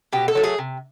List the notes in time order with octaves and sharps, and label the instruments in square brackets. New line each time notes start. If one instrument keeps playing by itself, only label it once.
[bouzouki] B2 G4
A4
F#3 A3
G#4
C3